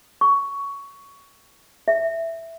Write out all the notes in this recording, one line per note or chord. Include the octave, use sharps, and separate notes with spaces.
C#6
E5